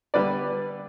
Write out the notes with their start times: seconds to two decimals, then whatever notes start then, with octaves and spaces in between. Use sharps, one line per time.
0.14 D3 G3 B3 B4 D5